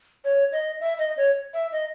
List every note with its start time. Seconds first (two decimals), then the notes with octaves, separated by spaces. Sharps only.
0.24 C#5
0.52 D#5
0.81 E5
0.99 D#5
1.17 C#5
1.54 E5
1.72 D#5